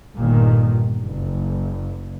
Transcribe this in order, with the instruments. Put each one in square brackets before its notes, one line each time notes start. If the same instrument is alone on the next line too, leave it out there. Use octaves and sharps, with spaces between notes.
[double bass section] G1 A#2 D#3
F#1